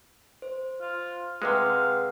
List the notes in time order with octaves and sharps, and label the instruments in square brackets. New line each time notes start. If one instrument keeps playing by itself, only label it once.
[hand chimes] C5
[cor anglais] F4
[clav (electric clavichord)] C3 G#3 [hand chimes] G#4 B4 F#5 [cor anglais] F5